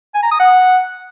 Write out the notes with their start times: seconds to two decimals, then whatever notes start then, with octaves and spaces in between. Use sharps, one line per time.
0.15 G#5
0.23 A#5
0.32 D#6
0.40 F#5